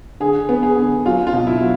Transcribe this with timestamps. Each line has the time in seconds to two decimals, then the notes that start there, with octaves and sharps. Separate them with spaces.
0.20 D3 G#4
0.49 B3
0.63 G#4
0.77 D3
1.05 F#3 F4
1.27 F4
1.33 B2
1.47 E4
1.61 F#3